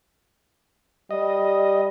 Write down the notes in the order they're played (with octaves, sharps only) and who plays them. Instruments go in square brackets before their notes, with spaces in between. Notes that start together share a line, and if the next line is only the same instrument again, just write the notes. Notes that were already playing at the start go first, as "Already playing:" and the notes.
[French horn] G3 [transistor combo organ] D#5